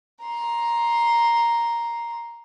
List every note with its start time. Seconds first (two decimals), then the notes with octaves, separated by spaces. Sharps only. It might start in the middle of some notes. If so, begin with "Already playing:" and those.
0.24 A#5 C6